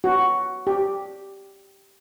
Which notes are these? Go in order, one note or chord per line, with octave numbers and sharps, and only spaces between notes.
F#4
G4